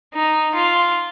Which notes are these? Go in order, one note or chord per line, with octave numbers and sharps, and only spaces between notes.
D#4
F4